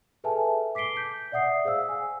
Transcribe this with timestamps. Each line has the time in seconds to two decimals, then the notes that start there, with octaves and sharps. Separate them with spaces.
0.24 G#4 A4 B4 E5 G#5 A5
0.75 D6 B6 C7 D7 G7
0.96 G6 B6
1.32 D5 E5 F#5 D#6 C7
1.65 G#4 C5 F5 E6
1.89 G#5